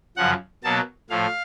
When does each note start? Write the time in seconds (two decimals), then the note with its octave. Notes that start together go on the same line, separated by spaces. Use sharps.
0.17 F#2 C#3 F3 F#5
0.63 B2 F#3 A#3 A5
1.10 A2 F3 A3 F5